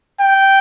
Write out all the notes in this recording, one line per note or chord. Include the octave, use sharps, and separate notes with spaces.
G5